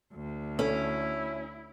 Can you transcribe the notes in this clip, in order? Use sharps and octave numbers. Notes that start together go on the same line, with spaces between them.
D2
C#4 E4 A4